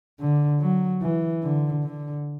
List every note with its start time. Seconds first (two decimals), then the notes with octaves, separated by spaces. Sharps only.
0.19 D3
0.60 F#3
1.02 E3
1.43 D3
1.83 D3